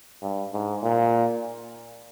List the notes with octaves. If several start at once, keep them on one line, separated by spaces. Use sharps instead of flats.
G2
G#2
A#2